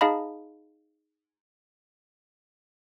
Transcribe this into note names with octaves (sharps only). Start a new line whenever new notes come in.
D#4 G#4 D#5 F5 A5 B5